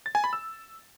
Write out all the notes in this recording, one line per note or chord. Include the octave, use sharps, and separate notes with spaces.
A6
G#5
B5
E6